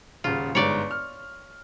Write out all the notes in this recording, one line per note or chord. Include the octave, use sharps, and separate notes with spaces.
D#1 C#3 F4
G1 G#2 C#5 D5
F6